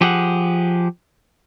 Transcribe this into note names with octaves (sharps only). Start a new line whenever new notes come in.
F3 G4 G#4 F#5